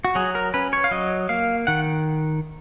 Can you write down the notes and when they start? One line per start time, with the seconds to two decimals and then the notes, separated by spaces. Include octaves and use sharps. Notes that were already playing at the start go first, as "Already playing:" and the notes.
0.05 F#4
0.15 F#3 G#4
0.35 A#4
0.54 C#4 B4
0.73 C#5
0.84 F5
0.91 F#3 D#5
1.29 A#3 F5
1.67 D#3 F#5